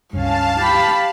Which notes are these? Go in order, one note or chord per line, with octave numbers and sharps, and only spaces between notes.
C#2 G2 C#4 F5 A5
G4 B5